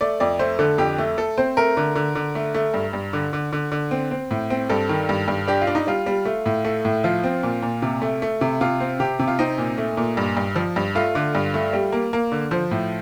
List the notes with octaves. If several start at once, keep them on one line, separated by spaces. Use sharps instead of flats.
A3 D5
F2 D5
A3 C5
D3 A4
F2 G4
A3
A3 A4
C4 C5
A3 A#4
D3
D3
D3
A3
A3
G2
G2
D3
D3
D3
D3
C4
C4
A2
C4
G2 A4
D#3
G2
G2
D4 G4
F4
D4
D#4
G3 F4
G3
A3
A2
A3
A2
F3 F4
C4
A#2
A#2
C3
A3
A3
C3
C3 F4
C4
C3 G4
C3
F4
C4 D#4
A#2
A3
A#2
G2
G2
F3
G2
A3 F4
D3
G2
A3
G3
A#3
A#3
D3
F3 C5
A2